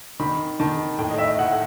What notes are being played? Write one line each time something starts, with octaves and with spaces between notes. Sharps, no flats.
D#3 B5
D#3 A5
A2 G5
D#5
E5
A2 F#5